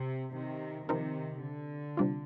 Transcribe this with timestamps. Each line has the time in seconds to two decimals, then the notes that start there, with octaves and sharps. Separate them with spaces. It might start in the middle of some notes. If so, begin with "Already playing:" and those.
Already playing: C3
0.34 C3 D#3
0.89 C3 D#3 F3 C4 D#4 A#4
1.43 D3
1.97 C3 G3 D4 F4